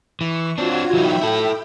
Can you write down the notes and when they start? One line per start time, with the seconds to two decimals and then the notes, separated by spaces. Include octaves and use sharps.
0.21 E3 C#6
0.58 C4 D4 F4 F#4 G#6
0.93 E3 F#3 D#4 E5 G5 B5
1.21 E4 A4